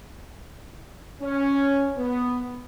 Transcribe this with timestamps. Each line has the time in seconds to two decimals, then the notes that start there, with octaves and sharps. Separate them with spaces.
1.22 C#4
1.97 B3